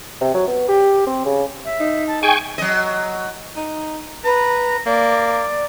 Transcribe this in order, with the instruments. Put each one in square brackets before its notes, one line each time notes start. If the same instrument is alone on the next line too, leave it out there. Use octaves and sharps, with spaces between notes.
[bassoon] C3
F#3
B3
G4
C4
C#3
[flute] E5
[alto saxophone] D#4
[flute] A5
[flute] G#4 [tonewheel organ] G5 G#5 C#6
[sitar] F#3 D#5
[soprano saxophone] D#4
[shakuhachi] B4 [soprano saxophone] A#5
[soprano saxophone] A#3 [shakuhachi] D5